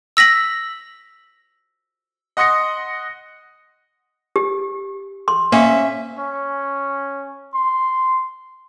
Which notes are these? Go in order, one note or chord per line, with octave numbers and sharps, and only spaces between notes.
E6 A#6 B6 F#7
D#5 F#5 C6 D#6 A#6 C#7
G4
C6
A#3 C#4 E5
C#4
C6